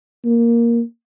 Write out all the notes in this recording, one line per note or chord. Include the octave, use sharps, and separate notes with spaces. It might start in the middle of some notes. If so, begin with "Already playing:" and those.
A#3